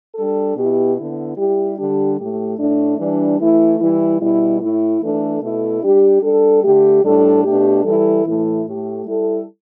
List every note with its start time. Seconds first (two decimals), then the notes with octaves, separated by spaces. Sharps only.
0.15 G3 D4 A4
0.56 B2 B3 E4 G4
0.96 D3 B3 E4
1.36 G3 E4 G4
1.77 D3 G3 D4 G4
2.17 A2 A3 G4
2.58 A2 A3 D4
2.98 E3 G3 D4
3.39 E3 A3 E4
3.79 E3 G3 E4
4.20 B2 G3 E4
4.61 A2 A3 E4
5.01 E3 A3 D4 A4
5.41 B2 A3 E4 A4
5.83 G3 D4 G4
6.22 G3 D4 A4
6.63 D3 A3 G4
7.04 A2 G3 D4 A4
7.45 B2 A3 D4 G4
7.85 E3 G3 E4 A4
8.24 A2 E3 A3 E4 A4
8.65 A2 A3 G4
9.06 G3 E4 A4